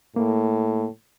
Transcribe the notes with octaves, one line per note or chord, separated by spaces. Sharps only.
A2 A#3